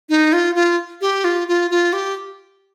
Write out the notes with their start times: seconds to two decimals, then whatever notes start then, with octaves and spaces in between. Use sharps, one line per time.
0.09 D#4
0.33 F4
0.55 F4
1.01 G4
1.24 F4
1.48 F4
1.71 F4
1.93 G4